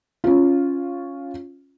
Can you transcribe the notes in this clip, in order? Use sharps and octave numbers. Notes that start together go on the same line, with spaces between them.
C#4 F4